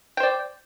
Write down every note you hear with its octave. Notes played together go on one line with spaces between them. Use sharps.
C5 D5 G5